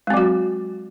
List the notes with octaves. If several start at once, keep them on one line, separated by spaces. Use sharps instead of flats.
F#3 G#3 C4 F#4